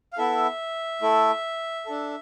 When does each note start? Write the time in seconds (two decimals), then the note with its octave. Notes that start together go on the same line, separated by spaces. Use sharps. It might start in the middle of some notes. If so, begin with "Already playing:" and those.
0.13 F5
0.18 B3 E4 A4 E5
1.02 A3 E4 A4
1.86 D4 A4